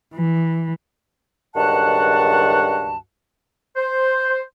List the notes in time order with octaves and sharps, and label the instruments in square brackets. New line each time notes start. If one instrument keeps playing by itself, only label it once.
[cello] E3
[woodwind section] C#2 G2 D#3 F#4 F#5 A5
C5